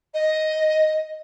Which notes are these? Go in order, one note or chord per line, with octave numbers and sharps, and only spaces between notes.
D#5